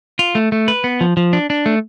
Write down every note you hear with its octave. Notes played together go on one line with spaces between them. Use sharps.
F4
A3
A3
B4
B3
F3
F3
D4
D4
A3